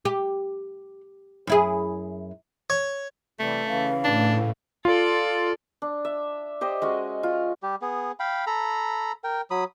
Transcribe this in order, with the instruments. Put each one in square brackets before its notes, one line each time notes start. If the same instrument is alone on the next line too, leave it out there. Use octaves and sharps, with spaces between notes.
[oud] G4
F#2 E4 G#4
[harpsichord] C#5
[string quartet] C3 E3 G3 [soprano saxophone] A3
[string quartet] C#3 E3 C#4 [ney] F5
[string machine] A2 [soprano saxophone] D4
[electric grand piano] F4 [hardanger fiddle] A4 D5
[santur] D4
E5
G4 C5 D#5
G#3 C#4 F#4
F4
[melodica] G3 G4
B3 G#4
F5 G5 B5
A4 A#5 B5
A#4 G5
F#3 B5 D#6